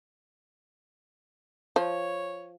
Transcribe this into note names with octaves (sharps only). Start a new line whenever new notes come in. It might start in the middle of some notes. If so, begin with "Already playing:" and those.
F3 C#5